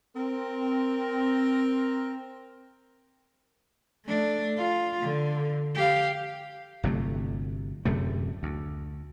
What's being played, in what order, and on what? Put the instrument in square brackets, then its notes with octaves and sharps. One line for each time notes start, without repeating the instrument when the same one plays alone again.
[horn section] C4 A#4
[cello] A3 D4
F4
D3
G4 F5
[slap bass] G1 C3 F#3 A3
D1 F#2 C3 A3
D2